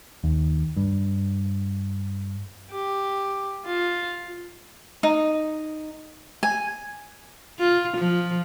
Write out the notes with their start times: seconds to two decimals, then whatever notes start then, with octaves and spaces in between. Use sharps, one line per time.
0.24 D#2
0.77 G2
2.70 G4
3.65 F4
5.03 D#4
6.43 G#5
7.59 F4
7.97 F3